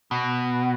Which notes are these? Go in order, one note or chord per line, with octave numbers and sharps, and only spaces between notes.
B2